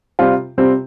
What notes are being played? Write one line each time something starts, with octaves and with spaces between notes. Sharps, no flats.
C3 G3 C4 F4
C3 G3 C4 F4